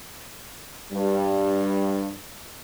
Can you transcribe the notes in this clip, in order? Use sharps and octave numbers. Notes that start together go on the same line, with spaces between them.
G2 G3